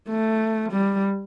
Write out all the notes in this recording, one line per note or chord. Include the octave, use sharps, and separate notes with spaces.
A3
G3